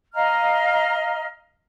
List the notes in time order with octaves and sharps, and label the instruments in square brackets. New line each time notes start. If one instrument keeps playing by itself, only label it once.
[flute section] D#5 F5 A#5 F6